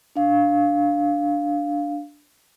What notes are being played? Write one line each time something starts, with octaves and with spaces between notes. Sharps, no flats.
D4 F5